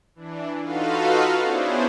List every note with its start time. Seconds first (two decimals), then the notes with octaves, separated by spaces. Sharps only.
0.15 E3 D4
0.62 D#4 F4 F#4 A4 B4 F5
1.41 B3 C#4 D4 E4 G#4 C5